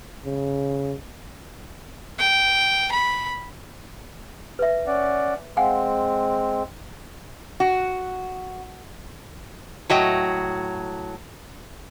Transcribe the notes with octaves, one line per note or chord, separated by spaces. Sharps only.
C#3
G5
B5
B4 E5
C#4 D5 F#5
G#3 C4 F5 F#5 G#5
F#4
A2 F#3 D#5 G5